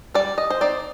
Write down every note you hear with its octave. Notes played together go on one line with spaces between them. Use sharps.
G3 D5
D#5
C5
C4 D#4 D5